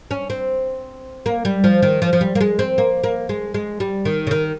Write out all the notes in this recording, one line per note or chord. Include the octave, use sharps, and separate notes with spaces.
C#4
C4
A#3
G3
F3
D#3
F3
F3
G3
A#3
G#3
C4
A#3
A#3
G#3
G#3
G3
D#3
C#3
D#3